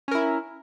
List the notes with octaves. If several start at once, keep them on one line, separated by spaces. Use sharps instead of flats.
C#4 E4 A#4